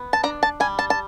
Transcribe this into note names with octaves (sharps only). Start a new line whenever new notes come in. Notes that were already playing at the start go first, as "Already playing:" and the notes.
Already playing: B3
A5
D4 A#5
A5
G3 G#5
A5
A5